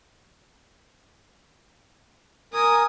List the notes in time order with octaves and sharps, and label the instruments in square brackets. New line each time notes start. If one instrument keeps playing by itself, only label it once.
[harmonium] A#4 G#5 [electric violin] D#6